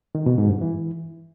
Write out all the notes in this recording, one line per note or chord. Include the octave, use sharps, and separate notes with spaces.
D#3
B2
G#2
G2
E3